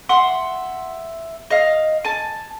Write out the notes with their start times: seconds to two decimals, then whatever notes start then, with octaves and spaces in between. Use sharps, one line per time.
0.09 E5 F#5 C6
1.50 D#5 F5
2.05 G#5 A5